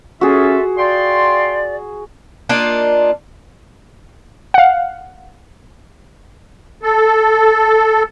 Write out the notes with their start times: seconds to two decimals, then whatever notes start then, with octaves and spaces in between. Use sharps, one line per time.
0.21 C#4 F4 F#4 G#4 A4 E5
0.78 D5 F5 G5 C6
2.49 A#3 D4 D#4 F4
4.54 F5 F#5
6.83 A4